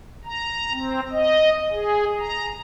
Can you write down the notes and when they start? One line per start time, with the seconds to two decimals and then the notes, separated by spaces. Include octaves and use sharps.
0.25 A#5
0.73 C4
1.12 D#5
1.72 G#4
2.20 A#5